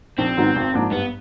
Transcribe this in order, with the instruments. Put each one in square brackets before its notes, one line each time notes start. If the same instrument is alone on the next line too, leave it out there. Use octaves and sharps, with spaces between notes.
[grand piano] A#1 [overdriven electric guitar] C4
[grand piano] G#2 D#3 F#3 B3
G#1
G#2 F3 A#3 D4
[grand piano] G2 [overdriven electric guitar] B3